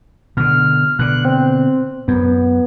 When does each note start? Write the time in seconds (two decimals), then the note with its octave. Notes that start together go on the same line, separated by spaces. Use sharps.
0.37 B2 D3 F6
0.99 B2 D3 F#6
1.25 C4
2.08 F#2 B3